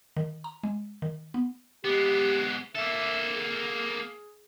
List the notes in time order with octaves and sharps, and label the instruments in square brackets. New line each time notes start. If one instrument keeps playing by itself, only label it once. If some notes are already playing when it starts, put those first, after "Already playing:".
[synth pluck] D#3
A#5
G#3
D#3
B3
[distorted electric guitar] G#3 B3 [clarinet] G4
[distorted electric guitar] A#3 A4 [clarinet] E5
[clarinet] G#4